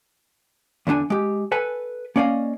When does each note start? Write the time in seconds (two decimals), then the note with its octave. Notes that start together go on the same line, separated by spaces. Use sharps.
0.87 E2 D3 F#3 D4 G#5
1.10 G#3 G4
1.52 A4 B4 G#5
2.16 A#3 C#4 D5 D#5 F5